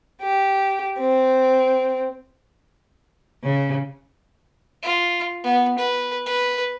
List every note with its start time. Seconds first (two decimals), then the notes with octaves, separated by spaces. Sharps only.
0.22 G4
0.99 C4
3.43 C#3
4.83 F4
5.44 B3
5.79 B4
6.26 B4